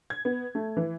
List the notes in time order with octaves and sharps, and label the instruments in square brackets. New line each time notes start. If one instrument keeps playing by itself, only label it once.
[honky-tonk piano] G#6
B3
A3
E3